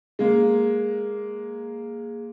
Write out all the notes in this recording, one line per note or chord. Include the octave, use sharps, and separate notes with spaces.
G#3 A#3